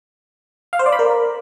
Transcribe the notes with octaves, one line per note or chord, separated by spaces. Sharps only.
F5
C5
D5
B5
A#4